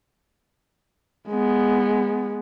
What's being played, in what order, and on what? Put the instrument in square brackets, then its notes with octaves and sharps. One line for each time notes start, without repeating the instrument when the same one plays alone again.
[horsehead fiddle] G#3 B3